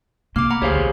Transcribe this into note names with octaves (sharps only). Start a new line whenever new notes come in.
C3 A#3 D6 F6
F#5 A#5 B5
D2 D3 G4 G#4 C5 C#5 F5
B1